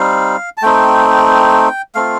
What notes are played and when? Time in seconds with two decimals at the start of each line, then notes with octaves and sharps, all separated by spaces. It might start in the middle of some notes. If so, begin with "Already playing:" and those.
Already playing: G3 C4 D#4 F5
0.57 A5
0.62 A3 C4 D#4 G5
1.95 A3 C4 F4 F5